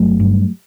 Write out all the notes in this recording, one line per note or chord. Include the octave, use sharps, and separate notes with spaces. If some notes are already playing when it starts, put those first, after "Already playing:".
Already playing: G1 F#3 A3
G2